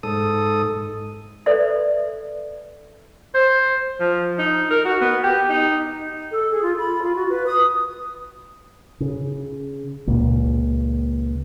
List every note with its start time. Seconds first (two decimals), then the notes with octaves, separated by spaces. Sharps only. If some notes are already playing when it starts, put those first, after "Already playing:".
0.03 G#2 A4 D#6
1.46 A4 B4 C5 D5 E5
3.35 C5
4.00 F3
4.39 D#4
4.71 A#4
4.85 F#4
5.01 B3
5.24 G4
5.50 D#4
6.31 A4
6.51 G#4
6.62 F4
6.78 B5
7.02 F4
7.16 F#4
7.30 B4
7.46 D#6
9.00 C#3
10.07 C#2 A#2 A#3